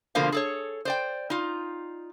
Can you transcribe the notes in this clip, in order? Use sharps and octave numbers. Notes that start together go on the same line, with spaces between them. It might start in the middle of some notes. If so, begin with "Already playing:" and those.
B2 D3 F3 A#3 C5 F5
G#4 A4 C#5
C5 D5 G5
D#4 F4